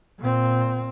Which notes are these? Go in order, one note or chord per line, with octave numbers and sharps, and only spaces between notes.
A#2 C4